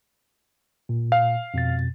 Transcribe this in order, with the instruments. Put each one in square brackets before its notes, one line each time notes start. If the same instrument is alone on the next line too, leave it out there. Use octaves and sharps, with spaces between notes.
[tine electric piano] A#2
[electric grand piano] F5
[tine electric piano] F2 B2 A6